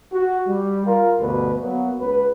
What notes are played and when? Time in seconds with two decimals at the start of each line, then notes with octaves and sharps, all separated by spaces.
0.13 F#4
0.47 G3
0.86 F4 A#4
1.19 D2 G2 B2 D4 B4
1.61 F#3 A#3 B3
2.01 C#2 B4